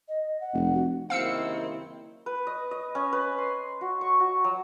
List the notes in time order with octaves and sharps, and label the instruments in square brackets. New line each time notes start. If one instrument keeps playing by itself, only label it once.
[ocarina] D#5
F#5
[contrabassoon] F1
[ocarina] F#4
[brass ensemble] F#1 C3 D#3 [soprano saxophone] C4 [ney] E4 [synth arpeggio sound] F5 E6 C#7
[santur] B4
D#5
D#5
C#4
B4
C6
F#4
C#6
F#4
F#3